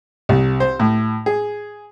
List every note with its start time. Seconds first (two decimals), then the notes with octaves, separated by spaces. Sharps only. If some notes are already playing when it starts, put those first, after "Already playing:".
0.29 C2
0.60 C5
0.80 A2
1.26 G#4